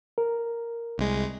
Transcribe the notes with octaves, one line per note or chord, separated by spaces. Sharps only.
A#4
C2 G#3